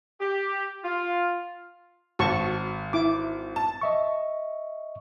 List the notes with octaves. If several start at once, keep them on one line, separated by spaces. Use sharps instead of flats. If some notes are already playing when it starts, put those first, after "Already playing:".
G4
F4
G#1 F#4 A5 C#6
E4 D6
A5
D#5 E5 C#6